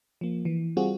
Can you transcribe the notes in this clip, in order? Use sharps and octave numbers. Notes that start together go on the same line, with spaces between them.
F3 A#3
E3
G3 C4 F4 F#4 G#4